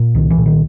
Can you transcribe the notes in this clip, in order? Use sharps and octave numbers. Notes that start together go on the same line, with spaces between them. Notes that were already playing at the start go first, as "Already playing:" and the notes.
Already playing: A#2
C2 D#3
E3
A#2
D#3